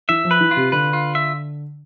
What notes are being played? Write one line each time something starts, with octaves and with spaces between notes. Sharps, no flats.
E3 E5
F3
B4
E3
F4
C3
D3 B4
F4
E5